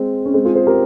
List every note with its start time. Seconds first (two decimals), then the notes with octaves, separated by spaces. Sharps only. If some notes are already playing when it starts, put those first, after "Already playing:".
Already playing: G#3 C4
0.25 C#4
0.34 G#3 C4
0.45 F4 G#4
0.55 G#4 C5
0.67 G4 A#4